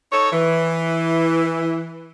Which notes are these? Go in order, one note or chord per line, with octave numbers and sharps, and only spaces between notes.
D#4 A4 C#5
E3